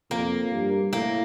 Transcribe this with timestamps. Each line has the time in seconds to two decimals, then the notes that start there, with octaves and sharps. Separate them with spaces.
0.11 F2 A#3
0.52 G2
0.93 A2 A#3